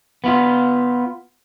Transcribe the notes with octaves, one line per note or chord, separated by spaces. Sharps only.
B3 F4